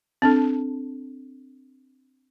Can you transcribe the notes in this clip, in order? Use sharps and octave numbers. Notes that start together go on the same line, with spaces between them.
C4 D4 A4